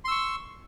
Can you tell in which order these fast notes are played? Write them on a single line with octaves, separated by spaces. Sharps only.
C6 E6 C#6